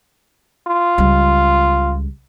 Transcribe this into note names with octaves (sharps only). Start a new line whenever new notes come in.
F4
C#2 G3